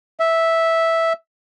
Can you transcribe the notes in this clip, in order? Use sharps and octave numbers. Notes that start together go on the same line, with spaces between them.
E5